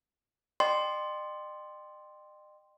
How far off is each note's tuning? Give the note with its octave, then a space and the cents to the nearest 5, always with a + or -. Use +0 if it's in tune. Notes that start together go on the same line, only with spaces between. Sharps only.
D#5 -45 G5 +0 C6 +0